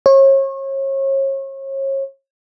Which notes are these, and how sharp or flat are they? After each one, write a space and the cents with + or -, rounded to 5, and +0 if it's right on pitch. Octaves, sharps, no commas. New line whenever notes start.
C#5 -35